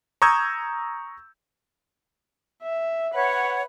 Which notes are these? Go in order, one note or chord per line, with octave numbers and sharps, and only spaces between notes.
A#5 C#6 D#6 E6 G6 G#6
E5
B4 C#5 F#5